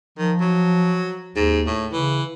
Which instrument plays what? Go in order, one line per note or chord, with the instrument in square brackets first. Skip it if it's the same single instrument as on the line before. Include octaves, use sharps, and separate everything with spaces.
[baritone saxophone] D#3 [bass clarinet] F3
[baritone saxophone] F#3
[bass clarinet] D#2 [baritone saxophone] G#2
[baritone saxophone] A2
[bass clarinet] C#3 [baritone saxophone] E3